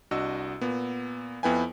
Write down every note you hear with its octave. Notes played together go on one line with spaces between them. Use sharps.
C2 D4 F#4 D#5 E6
A#2 B3
F2 B3 E4 B4 G5 G#5